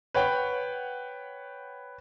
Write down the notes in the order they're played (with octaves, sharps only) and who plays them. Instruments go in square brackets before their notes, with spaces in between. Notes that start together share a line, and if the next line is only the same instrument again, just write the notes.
[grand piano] B4 C#5 F#5 G5